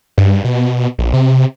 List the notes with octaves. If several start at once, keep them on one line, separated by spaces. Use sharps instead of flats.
G2
B2
A#1
C3